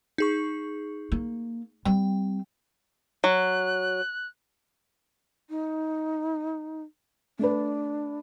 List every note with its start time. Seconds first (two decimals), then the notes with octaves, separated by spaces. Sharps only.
0.18 D#4 G#4 C#6
1.12 A#3
1.85 G3 C4 G5
3.24 F#3 F#6
5.49 D#4
7.39 A3 D4 B4